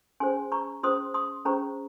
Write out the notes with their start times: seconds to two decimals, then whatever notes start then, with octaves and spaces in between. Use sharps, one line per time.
0.20 C#4 G#4 C5 G#5 C6
0.52 A#5 C#6
0.83 C#4 G#4 C5 C6 D#6
1.14 C6 D#6
1.45 C#4 G#4 C5 A#5 C#6